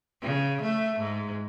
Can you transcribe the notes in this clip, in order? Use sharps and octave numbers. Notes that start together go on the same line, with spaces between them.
C#3
A3
G#2